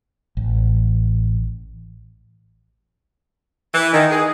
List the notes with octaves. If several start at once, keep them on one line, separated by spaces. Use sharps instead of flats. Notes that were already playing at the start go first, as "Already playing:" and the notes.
A1
E3
D#3
G#4